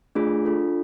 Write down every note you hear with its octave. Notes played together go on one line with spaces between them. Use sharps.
A3 D4 F4 G#4
D4 F4 A4